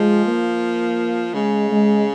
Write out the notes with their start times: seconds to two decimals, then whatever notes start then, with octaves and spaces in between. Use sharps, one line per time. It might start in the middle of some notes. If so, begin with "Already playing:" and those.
Already playing: F3 G#3
0.26 A#3
1.34 C#3 G#3
1.71 G#3